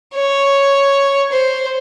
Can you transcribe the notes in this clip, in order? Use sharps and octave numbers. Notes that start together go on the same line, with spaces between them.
C#5
C5